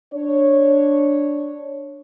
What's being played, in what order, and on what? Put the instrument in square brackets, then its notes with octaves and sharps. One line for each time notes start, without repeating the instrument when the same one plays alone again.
[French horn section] D4 C#5